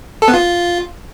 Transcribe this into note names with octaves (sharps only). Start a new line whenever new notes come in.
A4
B3
F4